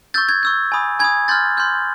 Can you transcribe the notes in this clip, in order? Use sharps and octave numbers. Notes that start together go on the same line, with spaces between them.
C#6 E6 G6 A6
G#6
C#6 E6 G6
G#5 B5 D#6
G#5 B5 D#6 G#6
C6 F6 G6 A6
C6 F6 G6